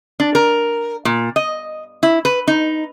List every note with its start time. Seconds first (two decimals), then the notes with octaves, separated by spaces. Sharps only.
0.20 D4
0.35 A#4
1.05 A#2
1.36 D#5
2.03 E4
2.25 B4
2.48 D#4